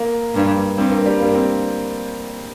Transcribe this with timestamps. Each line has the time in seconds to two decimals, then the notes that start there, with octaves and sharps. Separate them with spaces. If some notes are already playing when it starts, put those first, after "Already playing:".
Already playing: A#3
0.34 G2
0.78 G2 C4
0.91 A#3
1.06 G3
1.20 G2 A#3
1.34 C4